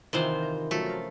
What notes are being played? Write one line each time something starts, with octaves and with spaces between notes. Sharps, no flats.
C3 D#3 E3 F4 C5
A#5
F3 F#3 A3 C#4
A#4 F5